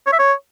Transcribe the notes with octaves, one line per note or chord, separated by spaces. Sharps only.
C#5
E5
C#5